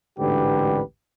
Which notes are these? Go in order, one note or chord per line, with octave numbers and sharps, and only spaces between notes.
A1 D2 G#2 D3 G4 B4